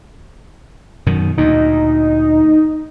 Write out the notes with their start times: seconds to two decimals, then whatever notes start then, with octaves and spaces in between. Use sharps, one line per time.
1.06 F#2 B2 D#3
1.38 D2 A#2 D#4